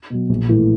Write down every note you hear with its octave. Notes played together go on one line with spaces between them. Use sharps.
B2 F#3
A#1
A2 E3 A3